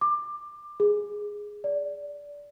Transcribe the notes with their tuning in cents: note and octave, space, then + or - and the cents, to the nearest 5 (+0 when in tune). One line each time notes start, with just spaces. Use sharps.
D6 +20
G#4 +0
D5 -15